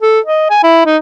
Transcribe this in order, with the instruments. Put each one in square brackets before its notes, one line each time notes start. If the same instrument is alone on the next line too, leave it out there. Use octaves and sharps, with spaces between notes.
[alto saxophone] A4
D#5
G#5
E4
D#4